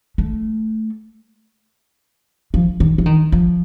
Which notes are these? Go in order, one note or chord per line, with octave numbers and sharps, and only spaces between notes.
A3
F3
D#3
E3
D#3
F3